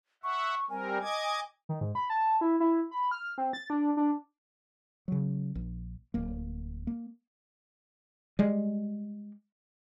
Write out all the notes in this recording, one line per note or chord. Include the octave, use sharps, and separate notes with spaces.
E5 F#5 C#6
G3 C4 A#4 G#5
D#5 D6 G#6
D#3
G#2
B5
A5
E4
E4
B5
F6
C4
A6
D4
D4
C#3 F#3
A#1
D1 A#3
A#3
G3 G#3